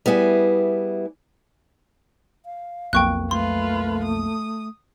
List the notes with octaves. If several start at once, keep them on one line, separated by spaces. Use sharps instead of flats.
G3 B3 E4 G#4
F5
B1 F2 A#3 G5 C#6 F#6
A3 F4 B4 C6
D#6